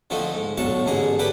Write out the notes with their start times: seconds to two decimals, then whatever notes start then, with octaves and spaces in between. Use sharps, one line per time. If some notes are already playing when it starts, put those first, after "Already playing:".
0.10 D3 F3 A3 C4 D#4
0.34 G#2
0.58 B1 A2 D3 A5 C#6
0.86 A1 G#2 D3 G#4 A#5
1.19 E4 G4 A4 B4 D5